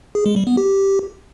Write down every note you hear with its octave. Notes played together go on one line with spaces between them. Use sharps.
G#4
G#3
G3
B3
G4